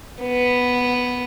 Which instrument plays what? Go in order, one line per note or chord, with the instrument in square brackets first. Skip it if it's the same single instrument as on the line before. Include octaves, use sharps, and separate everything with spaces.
[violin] B3